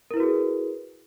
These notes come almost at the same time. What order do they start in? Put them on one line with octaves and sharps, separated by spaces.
A#4 E4 B4 F#4 G#4